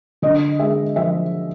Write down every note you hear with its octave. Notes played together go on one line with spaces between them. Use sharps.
D3 D#5
G#3 E5
F3 E5